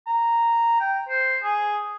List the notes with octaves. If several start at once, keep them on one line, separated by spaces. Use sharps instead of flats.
A#5
G5
C5
G#4